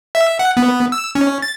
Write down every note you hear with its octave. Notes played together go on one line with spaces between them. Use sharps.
E5
F#5
B3
E6
C#4
A6